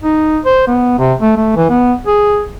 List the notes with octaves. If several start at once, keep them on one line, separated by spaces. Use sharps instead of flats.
D#4
C5
B3
C3
A3
A3
E3
B3
G#4